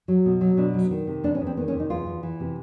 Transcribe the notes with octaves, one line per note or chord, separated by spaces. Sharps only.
F#3
B2
F#3
B2 D4
F#3
D#3
C3
E2 D4
C#4
E2
C4
D#3 B3
C#4
C3
D#4
E2 F4
E2
E3
C3